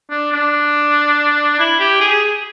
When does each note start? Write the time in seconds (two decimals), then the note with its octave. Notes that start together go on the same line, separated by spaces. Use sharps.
0.10 D4
0.32 D4
1.59 E4
1.80 G4
2.01 G#4